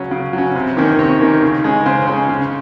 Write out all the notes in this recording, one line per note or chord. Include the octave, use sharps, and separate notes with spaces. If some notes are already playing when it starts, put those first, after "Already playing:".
Already playing: C#3 F#3 C#4
C#3
F#3 C#4
C3
D#3 A#3 C#4
C3 C#5
D#3 A#3 C#4
C#3
G#3 C#4
C#3 C5
G#3 C#4
C#3